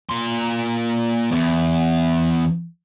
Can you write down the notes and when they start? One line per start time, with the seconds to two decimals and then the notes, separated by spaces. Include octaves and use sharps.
0.09 A#2 C6
1.31 E2